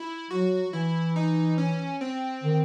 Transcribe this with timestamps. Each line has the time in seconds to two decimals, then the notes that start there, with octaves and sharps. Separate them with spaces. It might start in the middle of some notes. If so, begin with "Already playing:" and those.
Already playing: E4
0.30 F#3 F#4
0.73 E3 E4
1.16 D#4
1.58 C#4
2.01 C4
2.43 D#3